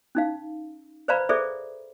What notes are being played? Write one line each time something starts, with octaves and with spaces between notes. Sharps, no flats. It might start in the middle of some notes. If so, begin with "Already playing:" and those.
C#4 D#4 F5
B4 C5 D5 F5 A#5 B5
G#4 A4 B4 C5 D5 E5